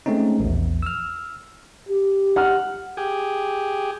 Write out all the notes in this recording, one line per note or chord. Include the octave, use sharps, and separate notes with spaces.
G#3 A3 C4 C#4 D#4
A#1 E2
E6 F6
G4
F#5 F6
G4 G#4